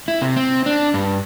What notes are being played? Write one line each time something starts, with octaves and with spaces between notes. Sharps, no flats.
E4
C3
C4
D4
G2